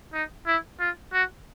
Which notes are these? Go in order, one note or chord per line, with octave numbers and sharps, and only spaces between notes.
D#4
E4
F4
F#4